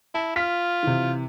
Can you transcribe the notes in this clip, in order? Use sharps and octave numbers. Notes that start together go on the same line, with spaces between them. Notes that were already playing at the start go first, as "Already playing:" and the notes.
E4 A5
F4 F6 B6
C3 E3